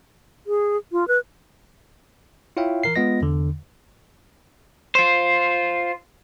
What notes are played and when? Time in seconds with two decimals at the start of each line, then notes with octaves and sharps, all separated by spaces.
0.47 G#4
0.92 F4
1.08 B4
2.57 E4 F4 C#5 E5 F5 G5
2.84 E3 A#4 C7
2.96 G#3 B3 F4 D#5 A#6
3.22 E2 D3
4.95 F4 C5